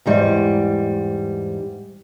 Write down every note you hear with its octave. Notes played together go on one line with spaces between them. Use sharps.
E2 G#2 G3